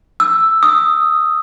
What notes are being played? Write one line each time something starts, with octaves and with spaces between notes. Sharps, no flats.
E6
D#6